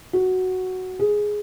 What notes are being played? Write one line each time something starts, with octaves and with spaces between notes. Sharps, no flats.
F#4
G#4